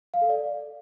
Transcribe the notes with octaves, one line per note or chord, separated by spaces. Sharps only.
F5
A4
D5